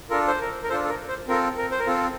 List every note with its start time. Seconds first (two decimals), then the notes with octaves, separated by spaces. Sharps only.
0.10 D4 F4 A4 A#4
0.28 C5
0.40 A#4
0.63 A#4
0.70 D4 F4 A4 C5
0.84 A4
0.89 A#4
1.08 C5
1.28 C4 F4 A4 A#4
1.57 A#4
1.72 C5
1.79 A#4
1.87 C4 F4 A4